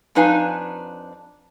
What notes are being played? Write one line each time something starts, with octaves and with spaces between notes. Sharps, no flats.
F2 D4 D#4 B4 F5 G#5